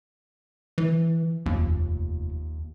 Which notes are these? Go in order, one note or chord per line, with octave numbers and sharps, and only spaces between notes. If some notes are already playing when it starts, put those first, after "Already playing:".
E3
F1 D#2